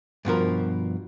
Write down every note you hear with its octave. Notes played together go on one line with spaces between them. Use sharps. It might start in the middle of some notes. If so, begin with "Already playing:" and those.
G2 B2 F3 A#4